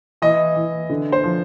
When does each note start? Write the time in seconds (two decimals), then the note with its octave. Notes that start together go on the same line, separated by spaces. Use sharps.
0.22 E3 D#5
0.56 E3
0.90 D3
1.12 C5
1.24 F3